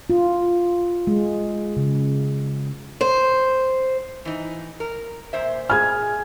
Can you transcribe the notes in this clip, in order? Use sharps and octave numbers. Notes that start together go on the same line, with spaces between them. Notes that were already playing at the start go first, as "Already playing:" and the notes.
F4
G#3
C#3
C5
E3 D#4
A#4
A#2 C5 E5
G#4 G#5 F6 G#6